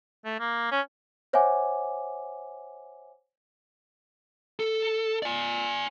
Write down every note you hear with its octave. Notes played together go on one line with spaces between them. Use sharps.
A3
A#3
C#4
C5 C#5 E5 F#5 G#5 D6
A4
D5 G#5